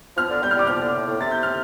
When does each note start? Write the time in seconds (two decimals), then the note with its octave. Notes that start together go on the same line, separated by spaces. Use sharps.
0.17 F3 F6
0.30 D3
0.42 G3 G6
0.51 F6
0.56 G3 D6
0.67 F3 F6
0.81 D3
0.95 A2
1.07 A2
1.20 C3 A6
1.31 G6
1.43 F6